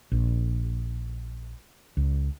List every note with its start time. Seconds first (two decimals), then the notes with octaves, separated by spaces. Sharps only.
0.12 A#1
1.97 C#2